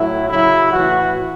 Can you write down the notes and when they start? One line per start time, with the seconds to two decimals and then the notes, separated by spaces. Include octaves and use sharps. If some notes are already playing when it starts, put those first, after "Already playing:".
Already playing: A2 F#3 E4
0.29 C#3 F#3 E4
0.73 A2 E3 F#4